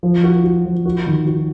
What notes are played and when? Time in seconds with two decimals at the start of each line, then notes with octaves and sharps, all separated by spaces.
0.03 F3
0.24 F#4
0.44 F#4
0.65 F3
0.85 F#4
1.07 D#3
1.26 F#4